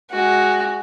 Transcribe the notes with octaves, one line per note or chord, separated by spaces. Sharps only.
G#3 F#4